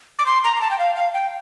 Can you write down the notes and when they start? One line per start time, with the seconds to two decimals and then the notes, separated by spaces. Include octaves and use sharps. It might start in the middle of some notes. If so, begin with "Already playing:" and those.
0.19 D6
0.26 C6
0.44 A#5
0.56 A#5
0.61 A5
0.71 G5
0.79 F5
0.96 F5
1.14 G5